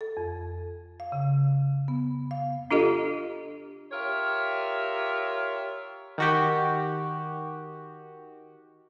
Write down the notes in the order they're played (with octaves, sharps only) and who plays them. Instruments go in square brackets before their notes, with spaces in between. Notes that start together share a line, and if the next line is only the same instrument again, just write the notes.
[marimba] A4
F2
F5
C#3
B3
F5
[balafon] D4 F4 G4 A4 D#5
[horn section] F4 G4 A#4 C#5 E5
[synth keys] D#3 F#4 G4